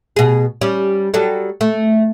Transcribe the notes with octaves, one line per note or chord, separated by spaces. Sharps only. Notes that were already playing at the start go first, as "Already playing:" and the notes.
B2 G#4
G3 C#4
F#3 G3 A4
A3